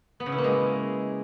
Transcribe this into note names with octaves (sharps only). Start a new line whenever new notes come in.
B3
C#3
E4
A#3
G#3